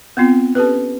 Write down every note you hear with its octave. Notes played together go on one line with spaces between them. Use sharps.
B3 C4 F4
C#4 G4 A4 B4